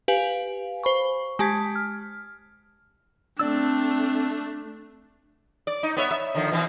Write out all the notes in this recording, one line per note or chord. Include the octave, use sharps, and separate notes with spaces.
G4 B4 F5 G#5
C5 B5 C#6
G#3 G4 A5 G#6 B6
F6
A3 C4 D4 D5 E6
D5
D#4
B3 C#5 E5
E5
D3 D#3 F3
B2 E3 C4